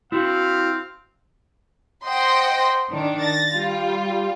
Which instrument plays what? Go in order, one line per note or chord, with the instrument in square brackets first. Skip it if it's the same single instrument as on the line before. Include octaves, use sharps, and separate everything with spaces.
[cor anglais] C4 [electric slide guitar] E4 F#4 [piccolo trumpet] F5
[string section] C5 D#5 F#5 G5 C6
D#3 D4
A6 A#6
G3 F4